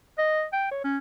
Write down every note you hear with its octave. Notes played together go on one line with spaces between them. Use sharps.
D#5
G5
C#5
C#4